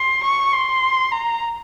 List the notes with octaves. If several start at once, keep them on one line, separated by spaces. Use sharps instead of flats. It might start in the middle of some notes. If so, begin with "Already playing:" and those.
Already playing: C6
C#6
C6
A#5